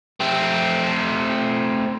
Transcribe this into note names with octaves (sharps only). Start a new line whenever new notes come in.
A3 C4